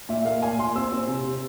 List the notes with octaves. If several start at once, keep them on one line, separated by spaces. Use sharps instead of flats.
A#2 E5
A#3 F5
A#2 G#5
A#2 C6
C4 E6
C4
C3
C3